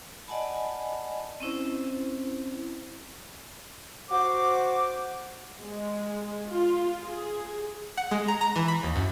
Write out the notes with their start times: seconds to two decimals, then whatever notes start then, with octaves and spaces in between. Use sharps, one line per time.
0.27 D5 D#5 F#5 G#5 A5 B5
1.40 C4 C#4 E4 C5
4.09 F#4 C5 D6
5.59 G#3
6.47 F4
7.04 G#4
7.97 F#5
8.11 G#3
8.28 A#5
8.41 A#5
8.56 E3
8.68 B5
8.83 D#2
8.96 F#2